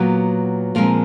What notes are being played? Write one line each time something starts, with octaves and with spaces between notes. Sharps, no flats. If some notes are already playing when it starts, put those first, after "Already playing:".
Already playing: A#2 F#3 B3
A#2 F3 G#3 C4 A#4